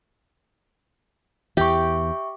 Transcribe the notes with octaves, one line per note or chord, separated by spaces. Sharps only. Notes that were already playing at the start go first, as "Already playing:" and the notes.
E2 E3 G4 E5 C#6